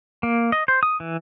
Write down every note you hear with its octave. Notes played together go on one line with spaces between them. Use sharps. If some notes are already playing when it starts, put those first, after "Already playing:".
A#3
D#5
C5
D#6
E3